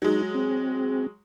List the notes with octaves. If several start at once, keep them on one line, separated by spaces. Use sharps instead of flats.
F#3 G#3 D#4
C4